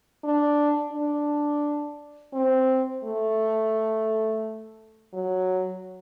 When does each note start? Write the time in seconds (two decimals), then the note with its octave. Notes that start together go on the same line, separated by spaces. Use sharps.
0.24 D4
0.93 D4
2.33 C4
3.04 A3
5.14 F#3